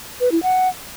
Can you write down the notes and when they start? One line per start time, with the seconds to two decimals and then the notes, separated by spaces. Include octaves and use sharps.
0.20 B4
0.32 E4
0.43 F#5